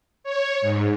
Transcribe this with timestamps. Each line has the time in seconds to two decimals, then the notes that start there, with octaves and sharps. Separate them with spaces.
0.24 C#5
0.61 G#2